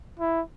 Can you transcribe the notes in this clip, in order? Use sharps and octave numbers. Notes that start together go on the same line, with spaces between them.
E4